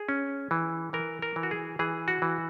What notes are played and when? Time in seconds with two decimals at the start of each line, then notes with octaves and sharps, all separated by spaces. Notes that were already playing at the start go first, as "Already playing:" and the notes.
Already playing: G#4
0.09 C#4
0.51 E3
0.93 E3 A#4
1.22 A#4
1.36 E3
1.43 F#4
1.51 G#4
1.79 E3 G#4
2.08 F#4
2.22 E3